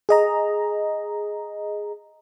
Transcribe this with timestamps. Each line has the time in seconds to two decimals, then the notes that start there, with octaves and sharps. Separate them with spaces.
0.09 G#4 D#5 A#5